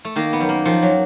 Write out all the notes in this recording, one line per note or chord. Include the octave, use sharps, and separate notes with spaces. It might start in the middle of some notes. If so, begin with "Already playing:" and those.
A3
D#3 A#3
B3
F#2
A#3
D#3 F3
F#3